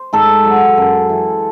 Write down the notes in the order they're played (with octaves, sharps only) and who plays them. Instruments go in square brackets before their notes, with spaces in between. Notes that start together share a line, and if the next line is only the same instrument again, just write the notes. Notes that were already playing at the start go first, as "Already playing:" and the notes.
Already playing: [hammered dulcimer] C5
G#2 A4
F#3
F#2
E3